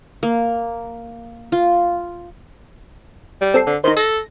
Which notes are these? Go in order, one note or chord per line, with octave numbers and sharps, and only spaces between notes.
A#3
F4
G3
C4 A4 C7
D3
D#3 D#4 C5
A4 A#6